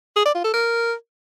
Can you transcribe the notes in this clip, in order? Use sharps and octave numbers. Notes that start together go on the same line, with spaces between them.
G#4
D5
F4
A4
A#4